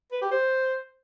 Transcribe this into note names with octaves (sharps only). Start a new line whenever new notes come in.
B4
G4
C5